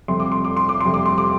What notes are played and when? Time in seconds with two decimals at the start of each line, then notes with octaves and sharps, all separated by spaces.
0.08 F2 C3 G3 C6
0.20 D6
0.32 C6
0.45 D6
0.57 C6
0.69 D6
0.81 F2 C3 G3 C6
0.94 D6
1.06 C6
1.18 D6